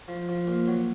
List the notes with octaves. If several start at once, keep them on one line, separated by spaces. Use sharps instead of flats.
F3
F3
A#2
F#3